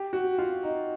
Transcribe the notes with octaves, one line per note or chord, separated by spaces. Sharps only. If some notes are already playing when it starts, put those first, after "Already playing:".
Already playing: G4
F#4
F4
D#4